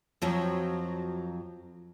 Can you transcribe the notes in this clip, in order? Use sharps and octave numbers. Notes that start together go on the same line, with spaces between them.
F2 F3 F#3